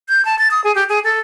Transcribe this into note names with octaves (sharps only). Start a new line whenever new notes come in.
G6
A5
A6
D#6
G#4
G4
G#4
A4